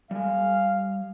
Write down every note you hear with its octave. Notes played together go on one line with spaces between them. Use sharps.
G3 F5 G#5